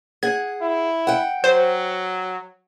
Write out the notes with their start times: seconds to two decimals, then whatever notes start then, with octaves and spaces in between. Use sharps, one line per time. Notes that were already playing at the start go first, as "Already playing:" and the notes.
0.23 G#4 F#5 G#6
0.61 E4
1.07 F#5 G5
1.44 F#3 C5